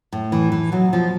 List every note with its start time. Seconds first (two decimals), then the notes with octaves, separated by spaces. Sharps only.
0.12 A2
0.32 E3
0.52 E3
0.72 B2 F#3
0.93 B2 F3